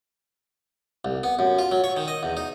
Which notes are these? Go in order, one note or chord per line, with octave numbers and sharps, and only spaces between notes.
C2
B3
F#2
F4
F#3
C#5
D#3
D#5
E2
D#4